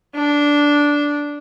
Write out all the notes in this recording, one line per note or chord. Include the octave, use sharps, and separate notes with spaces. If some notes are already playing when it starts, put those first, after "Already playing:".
D4